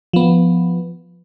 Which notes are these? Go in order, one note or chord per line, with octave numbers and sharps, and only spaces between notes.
F3 B3